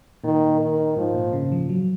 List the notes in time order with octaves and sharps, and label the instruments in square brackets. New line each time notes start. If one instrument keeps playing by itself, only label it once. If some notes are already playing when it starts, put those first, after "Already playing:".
[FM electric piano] A#2 [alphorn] D#3
[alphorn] D#3
[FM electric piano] G#2 [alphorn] F3
[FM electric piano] A#2
C#3
F3
F#3